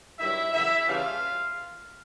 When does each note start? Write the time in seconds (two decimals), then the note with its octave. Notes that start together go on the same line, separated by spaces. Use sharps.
0.19 G2 D#3 F#3 E4 E5
0.53 F#2 C#3 E3 E4 E5
0.87 C#3 E3 G3 A#3 D4 F4 F5